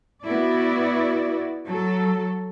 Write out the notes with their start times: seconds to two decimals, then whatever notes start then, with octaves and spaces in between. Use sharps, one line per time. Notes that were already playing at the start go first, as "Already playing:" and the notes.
0.24 B3 E4 F#4 D5
1.65 F#3 A4